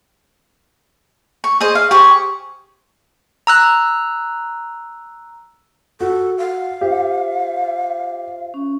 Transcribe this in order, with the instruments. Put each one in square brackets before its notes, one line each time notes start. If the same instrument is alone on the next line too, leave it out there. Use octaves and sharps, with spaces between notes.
[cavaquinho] C#6
G#4 C5 D#5
F5
[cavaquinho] G4 G#4 C5 [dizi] C#6
[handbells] A#5 E6 F#6
[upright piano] F#4 [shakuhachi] A4
[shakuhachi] F5 [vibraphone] F#5
[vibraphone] F4 C5 E5 [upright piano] G4
[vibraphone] C#4